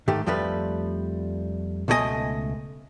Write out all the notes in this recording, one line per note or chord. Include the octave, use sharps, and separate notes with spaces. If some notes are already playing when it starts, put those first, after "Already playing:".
G#2 D#3 A3 G4
F2 F3 G3 A3 B4
C#2 B2 A3 D#4 D#5 G#5